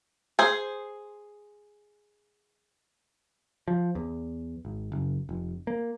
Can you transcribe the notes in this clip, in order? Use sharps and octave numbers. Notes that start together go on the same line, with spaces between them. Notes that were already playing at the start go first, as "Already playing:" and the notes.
G#4 C5
F3
E2
G#1
F#1
F1
A#3